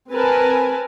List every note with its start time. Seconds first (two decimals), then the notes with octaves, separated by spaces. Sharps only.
0.11 C4 A#4 B4 G#5 A5